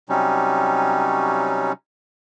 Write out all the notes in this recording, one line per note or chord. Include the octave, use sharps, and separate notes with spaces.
C3 F#3 G3 C#4 D#4